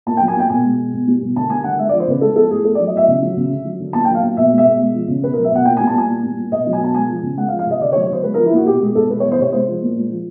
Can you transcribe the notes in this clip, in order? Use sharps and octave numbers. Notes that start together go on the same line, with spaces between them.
A#2 A5
G5
F#3
G#5
A#2 G5
B2 G#5
G#3
B2
B2
G3
B2
D3 A5
G3 G#5
D3 F#5
G#3 E5
D5
F3
C5
C#3 B4
G#3 A4
F3 A4
A2 G#4
A2 A4
D5
F#3
D#5
A2 E5
C#3
F#3
C#3
D3
F#3
D3
A#2 A5
G5
F#3
F5
A#2
B2 E5
G#3
E5
B2
G#3
F3
C#3
B2 B4
A#4
F#3
E5
B2 F#5
A#2 G5
G#5
G3
A5
A#2 G#5
A#2
G3
A#2
B2 D#5
F#3
G#5
B2 A5
G#3 G#5
F3
C#3
G#3 F#5
F5
F3
F5
C3 D#5
D3 D5
C#5
F#3
C#5
D3 C5
G#3 B4
A#4
F3
E4
A#2 F#4
B2 G4
G#3 G#4
B2 A4
G3 B4
C#5
E3
C5
C3 C#5
G#3 C5
F3
A#2
G#3
F3